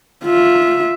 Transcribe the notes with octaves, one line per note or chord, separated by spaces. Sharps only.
F4 E5